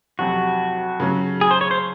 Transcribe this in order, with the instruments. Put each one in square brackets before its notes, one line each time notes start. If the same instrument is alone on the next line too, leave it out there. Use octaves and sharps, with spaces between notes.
[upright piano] F2 C3 F#3 [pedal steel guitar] F#4
[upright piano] C#3 F#3 C#4
[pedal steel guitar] G#4
C5
C#5
C5